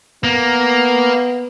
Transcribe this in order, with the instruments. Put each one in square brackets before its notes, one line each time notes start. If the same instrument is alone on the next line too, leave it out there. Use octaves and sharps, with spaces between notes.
[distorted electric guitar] A#3 [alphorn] B3